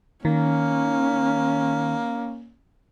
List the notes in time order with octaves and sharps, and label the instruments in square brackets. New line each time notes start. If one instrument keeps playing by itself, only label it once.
[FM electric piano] D#3 [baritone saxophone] A#3 [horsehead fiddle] C#4